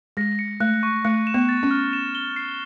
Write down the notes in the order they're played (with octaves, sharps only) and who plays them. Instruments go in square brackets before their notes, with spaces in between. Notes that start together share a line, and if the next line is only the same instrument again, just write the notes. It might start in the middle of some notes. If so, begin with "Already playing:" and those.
[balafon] G#3 [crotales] A#6
[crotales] C#7
[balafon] A3 [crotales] F#6
[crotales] C#6
[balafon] A3 [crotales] C#7
[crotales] E7
[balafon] B3
[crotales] A6
[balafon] C#4
[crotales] F6
E7
G7
C7